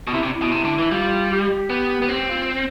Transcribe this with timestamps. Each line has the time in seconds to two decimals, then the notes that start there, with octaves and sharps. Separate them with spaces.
0.07 B2
0.12 C3 E4
0.23 C3 D4
0.35 E4
0.42 B2
0.52 C3
0.65 D3
0.79 E3
0.91 G3 F4
1.31 G4
1.70 B3
2.02 B3
2.09 C4 G4
2.28 F4